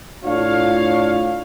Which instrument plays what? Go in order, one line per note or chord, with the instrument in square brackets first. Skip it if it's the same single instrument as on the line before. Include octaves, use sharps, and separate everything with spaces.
[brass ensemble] A2 D4 F4 C#5 F5